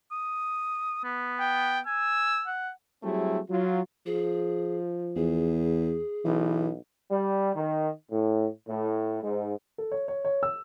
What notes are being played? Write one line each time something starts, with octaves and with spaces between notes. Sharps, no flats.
D#6
B3
G5
G#5 E6
F#5
F#3 G3 A3 C4 E4 G#4
F#3 F4
F3 G#4
E2 G#4
B1 E3
G3
D#3
A2
A2
G#2
A4
C#5
C#5
C#5
E6